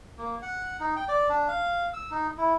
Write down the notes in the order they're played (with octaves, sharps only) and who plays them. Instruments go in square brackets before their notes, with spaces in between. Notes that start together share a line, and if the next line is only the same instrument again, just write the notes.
[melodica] A#3
F#5
D#4
G5
D5
D4
F5
E6
D#4
E4